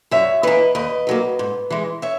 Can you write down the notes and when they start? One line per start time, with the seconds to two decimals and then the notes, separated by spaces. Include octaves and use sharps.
0.11 F#2 C#5 E5
0.43 E3 A#3 B4 D#5
0.75 D#2 B4 D#5
1.07 D#3 F#3 A#3
1.39 G#2
1.70 E3 G#3
2.02 C#5 E5